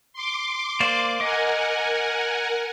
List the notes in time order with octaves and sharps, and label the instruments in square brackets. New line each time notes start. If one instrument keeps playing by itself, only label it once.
[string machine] C6 D6
[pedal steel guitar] A#3 C5 D5
[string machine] A#4 F#5 G#5 [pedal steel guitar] D#5 D6